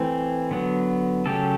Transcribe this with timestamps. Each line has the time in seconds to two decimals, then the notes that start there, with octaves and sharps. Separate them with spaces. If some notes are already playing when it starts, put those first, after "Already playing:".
Already playing: E3 A3 C4
0.51 D3 F#3 B3
1.26 C#3 F#3 A3 C#4 G4 A4